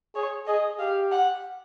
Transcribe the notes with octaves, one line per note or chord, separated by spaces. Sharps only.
G#4 C#5
G#4 D#5
G4 F5
F#5